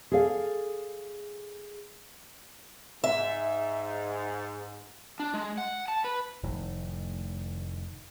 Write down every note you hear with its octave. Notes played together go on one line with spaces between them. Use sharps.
G#4 A4 D5 F5
G#2 E5
D4
G#3
F#5
A5
B4
F1 A2 D#3